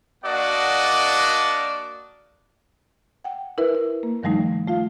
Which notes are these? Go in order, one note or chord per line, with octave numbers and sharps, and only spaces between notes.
A#3 D4 F#4 D5 D#5 F#5
F#5 G5
E4 A#4 B4 E5
E4
A#3
G2 D#3 F3 G3 A3 D#4
A3 F4 F5